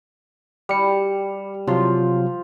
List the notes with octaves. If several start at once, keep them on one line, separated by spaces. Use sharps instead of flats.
G3 G4 C#7
C3 F3 F#3 F4